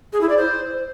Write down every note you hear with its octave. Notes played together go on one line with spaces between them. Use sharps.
G#4
E4
D5
C5